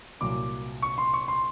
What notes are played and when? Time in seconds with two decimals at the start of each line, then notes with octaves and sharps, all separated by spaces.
0.21 C2 A#2 F#3 D6
0.82 C#6
0.98 C6
1.14 C#6
1.28 C6